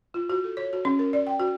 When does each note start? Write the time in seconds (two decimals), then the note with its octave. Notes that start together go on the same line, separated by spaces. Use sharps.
0.14 F4
0.30 F#4
0.44 A4
0.57 C#5
0.73 F#4
0.85 C#4
0.99 A#4
1.13 D5
1.27 G5
1.40 F#4